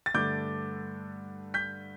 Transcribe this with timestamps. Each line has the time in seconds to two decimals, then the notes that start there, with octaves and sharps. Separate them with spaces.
0.06 A6
0.14 G2 D3 A3 D6 G6
1.54 G6 B6